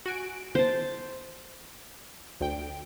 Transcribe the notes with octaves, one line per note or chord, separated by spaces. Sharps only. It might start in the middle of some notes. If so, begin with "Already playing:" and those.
F#4 G#5 D7
C5 A5
D2 G5 D7